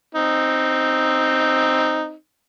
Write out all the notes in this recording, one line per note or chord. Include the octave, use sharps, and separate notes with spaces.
C4 D#4